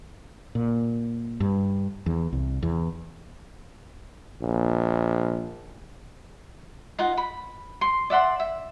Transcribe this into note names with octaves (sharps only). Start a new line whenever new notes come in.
A#2
G2
E2
C2
E2
A#1
D#4 F4 F#5
B5
C6
D5 E5 F#5 C6
E5